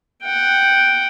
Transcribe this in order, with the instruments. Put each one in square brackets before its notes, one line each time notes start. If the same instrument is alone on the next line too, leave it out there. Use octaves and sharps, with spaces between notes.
[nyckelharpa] F#5 G5